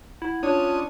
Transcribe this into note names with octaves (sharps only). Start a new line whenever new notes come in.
E4 F#5
C#4 D4 F4 C#5 D#6